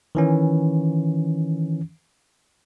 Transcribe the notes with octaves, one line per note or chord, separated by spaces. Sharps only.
D#3 E3 C#4